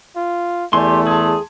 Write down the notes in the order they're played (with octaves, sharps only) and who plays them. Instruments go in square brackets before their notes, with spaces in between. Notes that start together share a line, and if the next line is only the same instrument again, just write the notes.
[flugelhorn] F4
[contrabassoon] E2 [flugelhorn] A3 [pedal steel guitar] G4 C6 [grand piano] D5 G#5
[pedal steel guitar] G#4 [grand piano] A5 C6 G#6